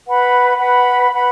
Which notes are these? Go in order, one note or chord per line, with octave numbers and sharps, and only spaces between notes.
B4 F#5 B5
B4 F#5 B5
B4 F#5 B5